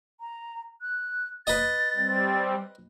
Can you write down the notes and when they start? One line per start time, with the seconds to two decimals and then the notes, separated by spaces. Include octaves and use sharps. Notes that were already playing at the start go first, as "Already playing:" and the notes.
0.20 A#5
0.82 F#6
1.47 B4 D#5 A6
1.97 G3 C4